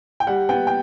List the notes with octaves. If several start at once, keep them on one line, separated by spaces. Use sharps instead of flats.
G5
G3 F#5
B3 G5
G5